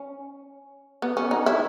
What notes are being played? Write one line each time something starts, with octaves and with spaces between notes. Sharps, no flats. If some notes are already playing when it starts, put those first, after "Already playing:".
Already playing: C#4
B3
C#4
D#4
E4